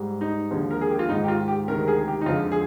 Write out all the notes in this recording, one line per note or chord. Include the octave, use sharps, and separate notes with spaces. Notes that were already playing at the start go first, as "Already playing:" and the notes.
Already playing: G#2 G3
D#4
D#2 D3 F3 G#3
A#4
G#4
G4
F4
G#2 D#3 G#3 D#4
G4
F4
G4
D2 C3 D#3 G#3 A#4
G#4
G4
D#4
F2 D3 F3 G#3 F4
G#4